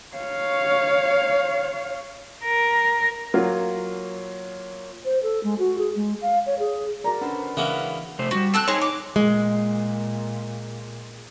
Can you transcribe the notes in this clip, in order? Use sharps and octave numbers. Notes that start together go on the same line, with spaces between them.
C#5 F5
A#4
F#3 A#3 F4
C5
A4
G#3
F#4
G#4
G#3
F5
C#5
G#4
F#4 A#4 D5 A#5
B3 C#4 D4 A4 C5
C#3 E3 G#3 A#3 C#4 E5 F#5
C3 A3 C5
A2 G3 F#4
C4 A4 F#6
C4 D#4 G#4 C#5
D6
A#2 G#3